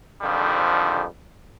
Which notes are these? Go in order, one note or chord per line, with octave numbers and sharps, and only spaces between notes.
F2 G#2 D3 D#3 F3 G3